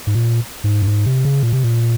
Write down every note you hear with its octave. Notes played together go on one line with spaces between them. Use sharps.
G#2
A#2
G#2
G2
G#2
C3
C#3
A#2
C3
A#2